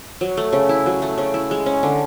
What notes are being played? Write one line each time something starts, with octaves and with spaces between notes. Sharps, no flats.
F#3
A3
C#3
E4
F#3
A3
C#3
E4
G#3
C#4
D3